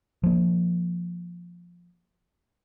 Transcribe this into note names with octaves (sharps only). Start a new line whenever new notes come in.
F3 A#3